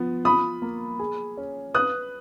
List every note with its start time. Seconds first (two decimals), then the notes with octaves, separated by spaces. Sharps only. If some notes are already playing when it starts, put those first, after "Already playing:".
Already playing: F3 B3
0.24 F4 B5 D#6
0.62 A#3
0.99 G#4
1.37 C#4
1.74 B4 D#6 F#6